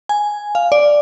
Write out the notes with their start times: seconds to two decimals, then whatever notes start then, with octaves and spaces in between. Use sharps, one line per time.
0.09 G#5
0.55 F5
0.72 D5